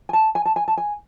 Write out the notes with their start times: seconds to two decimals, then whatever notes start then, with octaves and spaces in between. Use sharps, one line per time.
0.09 G#5
0.13 A5
0.35 G#5
0.45 A5
0.56 G#5
0.68 A5
0.77 G#5